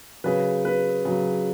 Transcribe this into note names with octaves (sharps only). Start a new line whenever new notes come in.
C#3 F#3 B4
B4
C#3 F#3